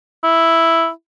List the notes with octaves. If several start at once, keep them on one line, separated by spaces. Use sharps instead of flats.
E4